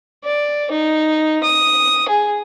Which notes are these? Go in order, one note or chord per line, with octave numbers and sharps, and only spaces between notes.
D5
D#4
D#6
G#4